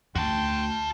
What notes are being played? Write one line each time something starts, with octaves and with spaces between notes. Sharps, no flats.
D2 F#4 G5 A5 C6